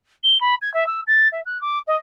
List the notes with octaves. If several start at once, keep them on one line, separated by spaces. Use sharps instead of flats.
G7
B5
G#6
E5
E6
A6
E5
F#6
D6
D#5